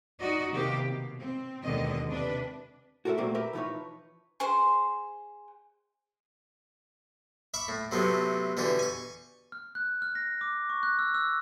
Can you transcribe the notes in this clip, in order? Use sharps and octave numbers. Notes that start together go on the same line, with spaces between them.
D#4 F#4 D5 D#5
C3 D#3 A#3 B3 G4
B2
C4
D#2 B2 D3 D#3 G#3 D#5
C3 D4 B4
F#4 A4 A#4 C#5 E5
A#2 F#3 G3 A3 A#3 C4
G4 A#4 B4 E5
E3 F3 D#4 A4 B4 C#5
G#4 C5 C6
E5 B5 C#6 D6
A2
A2 C3 F#3 A3 B3
B2 D3 E3 E4 G4
G#5 C#6
F6
F#6
F6
A#6
D6
C#6
F#6
E6
E6